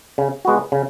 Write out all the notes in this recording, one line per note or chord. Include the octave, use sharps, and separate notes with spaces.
C#3
G#3 B3 F#4
C#3